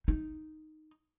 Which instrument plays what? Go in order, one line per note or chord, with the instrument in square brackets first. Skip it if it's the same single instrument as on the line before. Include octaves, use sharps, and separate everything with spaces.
[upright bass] D#4